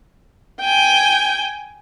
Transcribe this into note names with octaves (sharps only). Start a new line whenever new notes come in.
G5 G#5